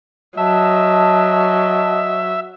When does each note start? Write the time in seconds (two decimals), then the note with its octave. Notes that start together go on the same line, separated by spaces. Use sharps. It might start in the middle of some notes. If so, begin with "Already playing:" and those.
0.37 F#3 D#5 E5 A5